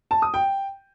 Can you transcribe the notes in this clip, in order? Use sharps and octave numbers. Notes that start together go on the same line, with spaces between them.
A5
D#6
G5